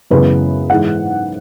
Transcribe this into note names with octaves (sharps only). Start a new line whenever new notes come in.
F#2 C#3 E3 G#3 B3 B4
G#2 E3 G#3 F#5